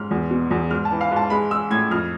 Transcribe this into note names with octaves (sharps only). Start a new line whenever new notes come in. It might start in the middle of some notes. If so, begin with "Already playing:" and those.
Already playing: G#2 F6
E2
B2
E2
G#2 F6
A5
E3
F5
G#2
A5
G#3 B5
G#3 E6
A2 G#6
F2 F6